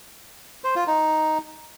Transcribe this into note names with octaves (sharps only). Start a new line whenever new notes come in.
C5
F4
D#4